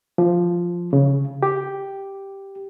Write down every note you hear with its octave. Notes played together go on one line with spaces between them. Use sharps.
F3
C#3
G4